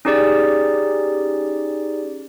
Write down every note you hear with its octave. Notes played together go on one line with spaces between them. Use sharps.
C#4 D#4 G4 G#4 D5